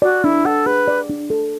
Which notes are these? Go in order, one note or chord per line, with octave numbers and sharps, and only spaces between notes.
F#4 D5
D4 E4
A4 F#5
G#4 B4
D5
D4
A4